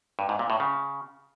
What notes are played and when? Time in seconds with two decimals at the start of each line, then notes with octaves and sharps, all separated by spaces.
0.19 G2
0.29 G#2
0.39 A#2
0.50 A2
0.60 C#3